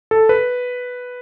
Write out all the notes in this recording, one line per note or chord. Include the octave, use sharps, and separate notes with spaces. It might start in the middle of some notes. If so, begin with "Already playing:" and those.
A4
B4